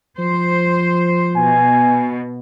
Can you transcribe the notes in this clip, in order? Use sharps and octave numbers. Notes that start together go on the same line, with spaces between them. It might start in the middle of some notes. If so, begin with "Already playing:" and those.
F3 C5
B2 G#5